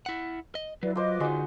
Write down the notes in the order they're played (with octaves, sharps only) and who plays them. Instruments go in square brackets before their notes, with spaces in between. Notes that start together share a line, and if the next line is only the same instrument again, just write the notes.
[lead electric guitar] E4 F#5
D#5
[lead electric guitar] F#3 [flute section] E4 B4 D5
[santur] F4 C5 [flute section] B4 D#5 D6
[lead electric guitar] D3 D#4 [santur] G#3 F#4